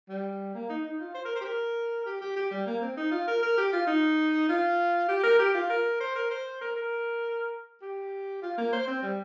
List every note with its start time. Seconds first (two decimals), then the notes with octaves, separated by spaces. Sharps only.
0.09 G3
0.54 A#3
0.69 D#4
0.84 D#4
1.00 F4
1.14 C5
1.25 A#4
1.35 C5
1.41 G4
1.45 A#4
2.06 G4
2.21 G4
2.36 G4
2.51 G3
2.66 A#3
2.81 C4
2.97 D#4
3.11 F4
3.27 A#4
3.43 A#4
3.57 G4
3.73 F4
3.87 D#4
4.49 F4
5.09 G4
5.23 A#4
5.39 G4
5.54 F4
5.70 A#4
6.00 C5
6.15 A#4
6.30 C5
6.61 A#4
6.76 A#4
7.82 G4
8.42 F4
8.58 A#3
8.72 C5
8.87 C4
9.02 G3